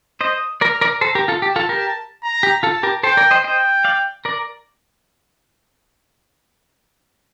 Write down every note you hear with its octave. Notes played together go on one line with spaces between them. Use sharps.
C5 D#5 D#6
A#4 D5 F6
A#4 D5
A4 C5 A#5
G4 A#4
F4 A4
G4 A5
F4 A4
G4 A#4
A#5
G4
F4 A4 A5
G4 A#4
A4 C5 G5
A#4 D5
C5 D#5
C5 D#5 G5
D5 F5
A#4 D5